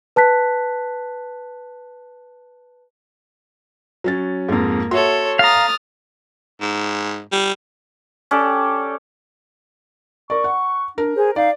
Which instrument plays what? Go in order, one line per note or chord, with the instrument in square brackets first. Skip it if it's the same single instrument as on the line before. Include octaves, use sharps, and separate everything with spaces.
[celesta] B4 A5 F#6 B6
[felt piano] F#3 C#4 A6
[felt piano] F2 G#2 [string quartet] A#3
[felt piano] F#4 E5 C6 [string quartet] A4 C#5
[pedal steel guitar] F5 A#5 [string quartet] D#6 F6 A6
[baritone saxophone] G#2
G3
[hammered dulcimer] C#4 G4 A4 D5
[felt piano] A#4 D5 [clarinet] C#6
[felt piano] F#5
[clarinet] D4 [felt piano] A#4
[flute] G#4 [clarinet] C5
[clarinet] D#4 [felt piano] D5 [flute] F5